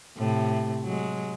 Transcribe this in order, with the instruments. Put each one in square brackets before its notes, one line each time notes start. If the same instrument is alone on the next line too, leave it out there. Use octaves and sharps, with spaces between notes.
[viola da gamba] A2 C3
F#3 G#3